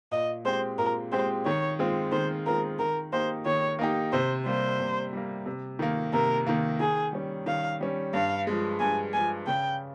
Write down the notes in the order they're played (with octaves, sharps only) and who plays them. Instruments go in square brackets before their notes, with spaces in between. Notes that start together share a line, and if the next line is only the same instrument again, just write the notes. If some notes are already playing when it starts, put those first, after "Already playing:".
[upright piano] A#2 [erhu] D#5
[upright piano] G#3 C4 G4 [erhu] C5
[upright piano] A#2 [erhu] A#4
[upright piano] G#3 C4 G4 [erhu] C5
[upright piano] D#3 [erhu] C#5
[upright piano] G#3 C4 F4
[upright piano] D#3 [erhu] C5
[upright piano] G#3 C4 F4 [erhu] A#4
[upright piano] D#3 [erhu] A#4
[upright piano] A#3 D#4 G4 [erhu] C5
[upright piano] D#3 [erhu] C#5
[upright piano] A#3 D#4 G4
[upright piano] C3 [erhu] C5
[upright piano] G3 A#3 [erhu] C5
[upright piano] C3
G3 A#3
C3
D#3 A#3
[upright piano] C3 [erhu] A#4
[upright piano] D#3 A#3
[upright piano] D#3 [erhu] G#4
[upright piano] G3 C#4
[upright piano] D#3 [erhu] F5
[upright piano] G3 C#4
[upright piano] G2 [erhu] F5
[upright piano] F3 G#3
[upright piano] G2 [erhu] G#5
[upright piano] F3 G#3 [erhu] G#5
[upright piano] C#3 [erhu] G5